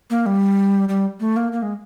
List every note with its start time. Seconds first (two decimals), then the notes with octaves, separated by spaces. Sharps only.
0.10 A#3
0.26 G3
0.89 G3
1.20 A3
1.36 A#3
1.52 A#3
1.63 G#3